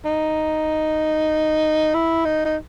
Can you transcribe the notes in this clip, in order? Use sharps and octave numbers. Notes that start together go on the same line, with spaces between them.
D#4
E4
D#4
D#4